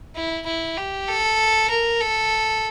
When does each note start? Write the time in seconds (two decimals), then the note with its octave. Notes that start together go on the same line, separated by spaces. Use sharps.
0.15 E4
0.46 E4
0.77 G4
1.08 A4
1.70 A#4
2.01 A4